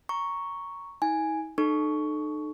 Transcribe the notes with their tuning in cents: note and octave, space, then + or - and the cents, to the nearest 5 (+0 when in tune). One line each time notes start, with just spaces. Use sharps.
A#5 +0 C#6 +0
D#4 +45 G#5 +0
D#4 -40 A4 -15 C#6 +10